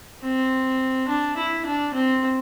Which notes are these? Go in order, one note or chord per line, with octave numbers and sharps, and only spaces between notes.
C4
D4
E4
D4
C4